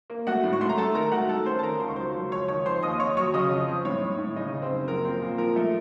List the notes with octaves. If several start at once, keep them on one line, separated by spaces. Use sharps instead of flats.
A#3
A3 F#4 F#5
A2
C#6
A3 C6
A#5
A3 A4 A5
D#3 A#4 A#5
A3 F#4 F#5
A3 A4 A5
C#4 C5 C6
A5
D#3 A#4 A#5
C#2 C6
C#6
F#3 C5 C6
C#2
F2 C#5 C#6
D#3 C#5 C#6
F2 C5 C6
D#2 D#5 D#6
D#2 C#5 C#6
F#3 C#5 C#6
C#3 D#5 D#6
F2
C4
A2 C#5 C#6
A2
A2
C#3 D#4 D#5
C#3
C4 C5
F#2
A#1 A#4
C4
A#2
F3 A#4
A3